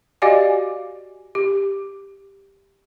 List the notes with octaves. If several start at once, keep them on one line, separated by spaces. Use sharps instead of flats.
F#4 G4 D5 D#5 F5 G#5
G4